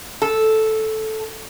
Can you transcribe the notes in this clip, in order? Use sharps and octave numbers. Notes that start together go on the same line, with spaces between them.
A4